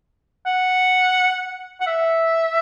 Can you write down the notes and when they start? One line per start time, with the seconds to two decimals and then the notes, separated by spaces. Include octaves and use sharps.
0.46 F#5
1.81 F#5
1.87 E5